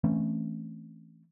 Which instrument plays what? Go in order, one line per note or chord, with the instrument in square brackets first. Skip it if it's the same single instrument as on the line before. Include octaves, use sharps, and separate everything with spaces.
[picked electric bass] E3 A3 C4 C#4